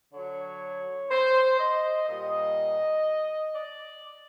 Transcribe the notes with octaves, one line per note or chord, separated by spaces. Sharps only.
D3 F#3 C#5
C5
D#5
A#2 G3 D#5
D5